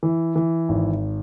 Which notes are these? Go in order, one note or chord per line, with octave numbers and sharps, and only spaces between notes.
E3
E3
G#1